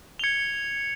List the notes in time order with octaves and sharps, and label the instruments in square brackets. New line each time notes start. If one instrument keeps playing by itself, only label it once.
[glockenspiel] G#6 G7 [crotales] C#7 F7